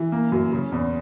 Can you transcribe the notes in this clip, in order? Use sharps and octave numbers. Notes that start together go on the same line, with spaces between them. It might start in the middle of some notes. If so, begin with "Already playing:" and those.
Already playing: E3
A#3
F#2
C#3
E2